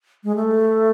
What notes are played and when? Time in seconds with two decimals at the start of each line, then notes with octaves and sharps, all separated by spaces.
0.24 G#3
0.35 A3